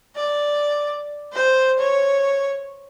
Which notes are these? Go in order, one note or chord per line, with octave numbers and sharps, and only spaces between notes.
D5
C5
C#5